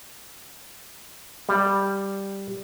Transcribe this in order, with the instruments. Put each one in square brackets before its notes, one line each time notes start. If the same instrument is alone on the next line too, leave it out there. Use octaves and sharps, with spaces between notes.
[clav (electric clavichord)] G3